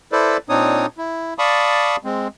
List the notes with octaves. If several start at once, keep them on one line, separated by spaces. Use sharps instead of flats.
E4 A4 B4 C5 D5
A#2 C4 D4 D#4 C#5 D#6
E4
D5 F5 A5 B5 C#6 D#6
G#3 C4